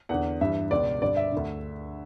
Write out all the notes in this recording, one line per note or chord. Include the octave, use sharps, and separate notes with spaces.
E2 D3 F#5
G2 E3 E5
C#2 B2 D5
G2 D3 D5
E5
D2 D3